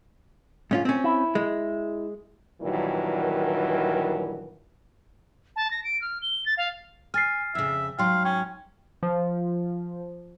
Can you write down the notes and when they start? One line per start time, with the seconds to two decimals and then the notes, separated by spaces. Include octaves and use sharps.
0.71 G#2 C#4 F4
0.85 C4 C#4
1.04 E4
1.35 G#3
2.62 G2 A#2 D#3 E3 F#3
5.56 A5
5.70 A#6
5.84 D7
6.01 F6
6.22 G7
6.46 A6
6.57 F5
7.14 G#5 F6 A6 C7
7.55 F2 C#3 E5
7.99 G#2 F#3 F5 G5 C6
8.25 C#4 G5
9.03 F3